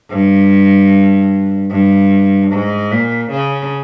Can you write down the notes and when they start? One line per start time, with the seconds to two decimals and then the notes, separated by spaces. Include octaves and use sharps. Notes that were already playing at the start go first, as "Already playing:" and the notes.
0.10 G2
1.71 G2
2.52 G#2
2.91 A#2
3.31 C#3